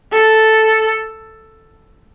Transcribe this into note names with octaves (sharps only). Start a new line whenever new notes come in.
A4